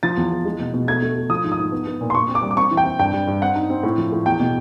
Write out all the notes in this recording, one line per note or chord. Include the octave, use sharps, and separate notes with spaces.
F3 A6
E2
E2
G#3
B2
B2
A3 G#6
A3
A3
F3 D#6
G#2
D#6
G#2
B3
B3
A#2
C6
A#2 C#6
C4
D6
G3
D6
C4 C#6
E3
G5
C4
G2 G5
G2
G2
C4 F#5
D#4
C4
A2
F3
A2
E2 G5
B2